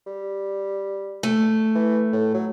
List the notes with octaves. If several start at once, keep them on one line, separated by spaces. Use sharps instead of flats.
G3
A3
E3
A2
F#3